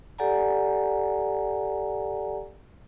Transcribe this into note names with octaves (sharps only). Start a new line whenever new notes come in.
G4 A4 D5 F#5 G#5 A#5